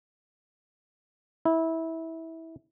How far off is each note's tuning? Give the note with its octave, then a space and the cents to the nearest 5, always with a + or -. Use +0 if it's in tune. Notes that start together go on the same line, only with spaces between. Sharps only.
E4 -20